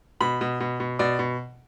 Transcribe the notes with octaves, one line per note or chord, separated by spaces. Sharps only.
B2 B5
B2
B2
B2
B2 D5
B2